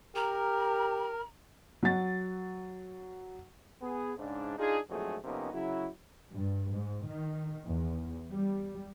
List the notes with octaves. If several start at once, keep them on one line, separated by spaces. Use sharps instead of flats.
G4 A#4 A#5
F#3 A6
B3 G#4
G#2 C#3 D4
D4 D#4 F4 G#4
A#1 F2 G#2 F#3 A3 G#4
F2 C3 A#3 B3 C#4 D#4
C#3 F#3 E4
G2
G#2
D#3
E2
G3